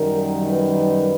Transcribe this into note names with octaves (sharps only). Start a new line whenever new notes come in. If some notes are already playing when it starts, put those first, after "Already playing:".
Already playing: F#2 D#3 G3 A#4
B4